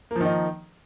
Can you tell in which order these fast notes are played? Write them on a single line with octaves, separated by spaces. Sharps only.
A#3 F3 D#3 D#4